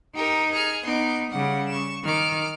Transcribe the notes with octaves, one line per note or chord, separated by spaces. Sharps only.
D#4 G4 A#4
G#4 F6
B3 D#4 C6 D6
C#3 G3 F#5
C#6 E7
D#3 D6 F6